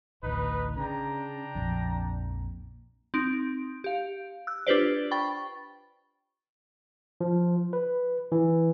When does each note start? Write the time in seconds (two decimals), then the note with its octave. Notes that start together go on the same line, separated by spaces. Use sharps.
0.23 A1 D2 D#4 B4
0.76 C#3 D4 G5 A#5
1.55 A#1 F2
3.14 C4 D#4 D7
3.84 G4 F5
4.47 E6 F#6
4.67 D4 F4 G4 B4 C5 D5
5.11 G5 B5 C#6 A6
7.21 F3
7.73 B4
8.32 E3